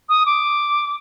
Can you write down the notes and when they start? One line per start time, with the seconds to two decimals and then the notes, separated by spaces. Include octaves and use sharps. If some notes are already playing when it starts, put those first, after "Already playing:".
0.09 D#6
0.26 D6